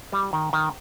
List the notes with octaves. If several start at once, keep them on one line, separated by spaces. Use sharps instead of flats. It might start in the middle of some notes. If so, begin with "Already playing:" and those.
G3
D#3
D#3